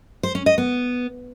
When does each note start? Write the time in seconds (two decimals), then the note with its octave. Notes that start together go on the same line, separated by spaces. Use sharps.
0.23 C5
0.35 C#4
0.46 D#5
0.58 B3